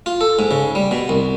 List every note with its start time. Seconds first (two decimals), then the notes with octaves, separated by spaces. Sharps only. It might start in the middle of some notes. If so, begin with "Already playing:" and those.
0.06 F4
0.21 A4
0.39 G#2
0.51 C#3
0.75 G3
0.91 B2
1.09 C2